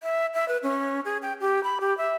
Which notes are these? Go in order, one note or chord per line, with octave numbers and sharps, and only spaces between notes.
E5
E5
B4
C#4
G#4
G5
G4
B5
G4
E5